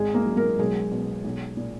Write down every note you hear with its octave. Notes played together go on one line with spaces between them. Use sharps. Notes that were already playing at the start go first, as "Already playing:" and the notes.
Already playing: G#1 G#3 G#4
A#3 A#4
F#3
A#3 A#4
B1 G#3 G#4
B2
B1
A#2